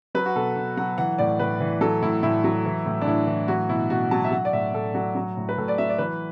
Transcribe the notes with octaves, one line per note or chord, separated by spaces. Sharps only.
F#3 B4
F#4
B2 A4
B2
F#3 F#5
E3 F#5
A2 D5
A2 B4
E3
F#3 A4
A2 E4
A2 E4
F#3
E3
A2
D4
A2 E4
E3
F#3 F#4
B2 E4
B2 F#4
F#3 A5
E5
F#3 F#5
D5
A2 E5
A2 A4
F#3 F#4
F#3
A2
B4
A2 A4
D5
F#3 E5
D5
E3 B4